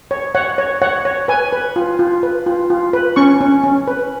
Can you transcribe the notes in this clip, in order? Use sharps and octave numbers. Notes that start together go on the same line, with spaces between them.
C#5
C#5 F#5
C#5
C#5 F#5
C#5
B4 G#5
B4
F4
F4
B4
F4
F4
B4
C#4 C#6
C#4
C#4
B4